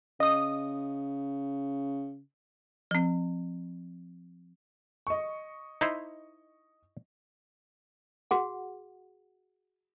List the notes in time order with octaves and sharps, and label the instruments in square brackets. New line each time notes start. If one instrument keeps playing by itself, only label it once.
[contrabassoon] C#3 [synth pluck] D#5 D#6
[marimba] F3 C4
[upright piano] D#5 C#6
[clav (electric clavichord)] D#4 E4 C5
[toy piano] F#4 G#4 F#5